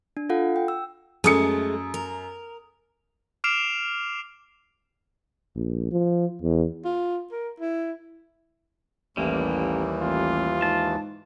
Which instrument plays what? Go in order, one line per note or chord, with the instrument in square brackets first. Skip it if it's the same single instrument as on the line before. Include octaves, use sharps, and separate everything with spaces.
[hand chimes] D4
F4 A4 F5 F#5
G5
E6
[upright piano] F#2 D#6 C#7 [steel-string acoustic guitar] G#3 A3
[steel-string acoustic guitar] A#4
[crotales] D6 F6 C7 D7 E7 F7
[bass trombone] A#1
F3
E2
[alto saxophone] F4
A#4
E4
[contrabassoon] A1 [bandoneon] D#2 E3 [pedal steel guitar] G3 A#3
[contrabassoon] A1 [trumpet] F4
[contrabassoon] G#2 [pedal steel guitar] A5